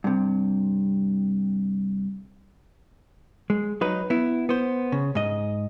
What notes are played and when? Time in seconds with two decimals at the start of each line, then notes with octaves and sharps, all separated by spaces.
0.04 G2 C3
3.50 G#3
3.81 F#3 D#4 B4
4.10 B3 E4
4.49 B3 C5
4.92 C#3
5.15 G#2 D#5